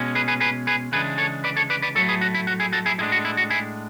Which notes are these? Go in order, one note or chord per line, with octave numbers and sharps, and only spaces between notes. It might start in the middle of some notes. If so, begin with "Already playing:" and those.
Already playing: B2 G#3 C#4
G#4 B4
G#4 B4
G#4 B4
G#4 B4
C#3 E3 G#3 D4 G#4 B4
A4 C#5
B4 D5
A4 C#5
B4 D5
B4 D5
A2 F#3 A3 A4 C#5
G#4 B4
F#4
E4
F#4
E4 G#4
F#4 A4
E4 G#4
A2 G#3 D4 E4
F#4
E4
F#4
E4 G#4